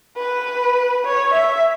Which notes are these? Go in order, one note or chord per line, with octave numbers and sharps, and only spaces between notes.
B4
C#5
E5